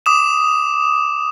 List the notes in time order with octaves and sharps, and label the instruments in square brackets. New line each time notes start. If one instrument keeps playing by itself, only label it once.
[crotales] D6 D#6 E7